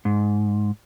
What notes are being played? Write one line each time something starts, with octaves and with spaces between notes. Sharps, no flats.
G#2